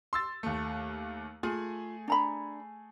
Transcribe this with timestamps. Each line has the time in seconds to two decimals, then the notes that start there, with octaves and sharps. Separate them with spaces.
0.13 C6 E6 A6
0.43 D#2 A3
1.43 A3 F4 G#4 G#5
2.08 D4 A#5 B5